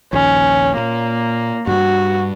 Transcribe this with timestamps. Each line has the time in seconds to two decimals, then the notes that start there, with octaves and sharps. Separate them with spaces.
0.13 A#1 D#2 C#4
0.77 A#2 A#3
1.67 G2 G3 F#4